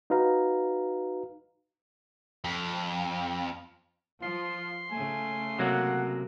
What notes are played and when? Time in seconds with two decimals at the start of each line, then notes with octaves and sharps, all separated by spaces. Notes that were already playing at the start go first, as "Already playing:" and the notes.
0.10 D#4 F#4 B4 F5 A#5
2.45 F2
4.22 F3 F4 C6
4.91 C#3 A3 G#5
5.59 C3 F#3 A#3 F#5